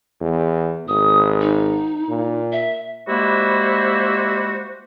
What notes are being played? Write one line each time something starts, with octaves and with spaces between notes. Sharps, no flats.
E2
G#1 D#6
D#4
A#2
E5
G3 G#3 A#3 E4 F#4 C5